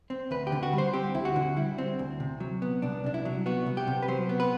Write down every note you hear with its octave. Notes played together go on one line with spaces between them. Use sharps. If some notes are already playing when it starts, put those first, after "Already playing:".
C4
D2 B4
G4
D3
F#4
G3
C5
C4 G4
D2 E4
F#4
D3
G3 E4
C4
D2
C3
F#3
B3
C2 D4
C3 D4
E4
F#3
B3 F#4
C2
G4
C3
B4
F#3 C5
B3
B4